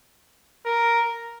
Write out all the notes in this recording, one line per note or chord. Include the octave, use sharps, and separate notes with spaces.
A#4